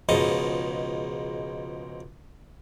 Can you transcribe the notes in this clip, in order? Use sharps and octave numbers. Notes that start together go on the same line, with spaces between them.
C#2 G#2 B2 F3 D#5 A5